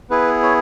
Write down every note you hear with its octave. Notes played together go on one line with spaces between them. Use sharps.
B3 E4 G#4 B4
C#5